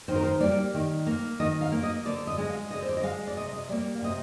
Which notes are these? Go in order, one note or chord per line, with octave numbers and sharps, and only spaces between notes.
D#3 C5
A#4
C5
G3 A#3 D5
D#3
A#3
D#3 D#5
F5
A#3
D#5
D3 D5
D#5
G#3 D#5
F5
D3 D#5
C5
D5
D#5
G#3 F5
D5
C3 D#5
D#5
G3 A#3 D5
F5
C3 D#5